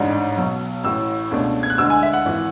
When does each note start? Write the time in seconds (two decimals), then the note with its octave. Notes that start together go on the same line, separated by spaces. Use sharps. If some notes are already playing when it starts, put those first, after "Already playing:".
Already playing: A1 G#2 G#3 D4
0.37 B1 B2 F#3
0.83 A1 A2 E3 E6
1.31 C#2 B2 A3 D4
1.63 G#6
1.70 F#6
1.78 D2 D3 G#3 E6
1.90 G#5
2.03 E5
2.13 F#5
2.25 G#1 E3